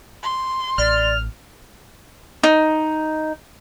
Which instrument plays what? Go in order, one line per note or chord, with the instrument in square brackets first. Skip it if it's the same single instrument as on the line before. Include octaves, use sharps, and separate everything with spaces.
[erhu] C6
[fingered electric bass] A1 [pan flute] D5 [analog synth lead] F6
[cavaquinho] D#4